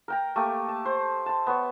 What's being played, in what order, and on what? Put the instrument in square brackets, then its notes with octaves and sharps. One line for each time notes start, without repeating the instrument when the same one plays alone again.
[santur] A#4 G5 A#5
A3 A#3 G4 G#5
A5
C5
A5 C6
B3 C#5